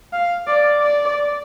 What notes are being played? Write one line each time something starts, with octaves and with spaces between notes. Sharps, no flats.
F5
D5
D5